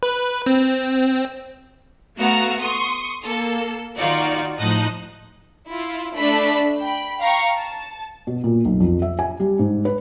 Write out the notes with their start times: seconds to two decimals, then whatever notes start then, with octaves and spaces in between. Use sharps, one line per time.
0.03 B4
0.46 C4
2.19 A3 B3 F#4 F5 A#5
2.61 C6 C#6 D#6
3.24 A#3 A4
3.97 D#3 D#4 F4 F#4 D5
4.60 A2 F3 D#4 D#5 A5 F#6
5.67 E4 F4
6.15 A3 D4 B5 B6
6.80 G5 B5
7.20 F5 G5 A#5 C#6
7.56 A5
8.27 B2
8.44 A#2
8.65 B1
8.80 F2
9.02 E5
9.19 G#5
9.40 G3
9.59 G#2
9.85 B4